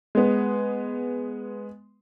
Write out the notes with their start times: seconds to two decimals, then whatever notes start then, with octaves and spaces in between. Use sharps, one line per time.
0.15 G#3 B3